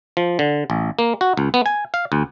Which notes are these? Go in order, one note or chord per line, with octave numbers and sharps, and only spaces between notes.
F3
D3
A1
A#3
F#4
C#2
B3
G#5
F5
D2